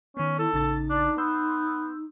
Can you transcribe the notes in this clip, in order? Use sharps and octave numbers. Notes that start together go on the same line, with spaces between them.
D#3 B3 C#4
E4 A4
A1 C#3 D#4 A6
D4
B3 C6 E6 G6